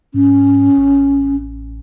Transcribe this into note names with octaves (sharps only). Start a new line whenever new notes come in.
G#2 C#4
A1